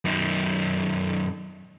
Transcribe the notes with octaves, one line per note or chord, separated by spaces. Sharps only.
F#2 D#3